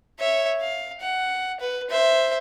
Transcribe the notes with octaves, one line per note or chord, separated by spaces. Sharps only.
C#5 E5
F5
F#5
B4
C5 E5